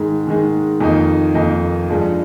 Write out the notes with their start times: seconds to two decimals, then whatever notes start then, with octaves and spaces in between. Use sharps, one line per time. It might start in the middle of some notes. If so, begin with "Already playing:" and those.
Already playing: G#2 D#3 G#3
0.27 G#2 D#3 G#3
0.81 F2 D#3 A#3 D#4
1.34 F2 D#3 A#3 D#4
1.88 G2 F3 G#3